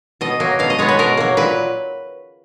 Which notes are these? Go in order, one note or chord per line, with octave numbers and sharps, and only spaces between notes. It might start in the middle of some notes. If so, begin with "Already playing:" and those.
B2 D#5
F#3 A#3
B2 F5
D#5
G#3 B3 C#5
B4
B2 A#4
F#3 A#3
A#2 B4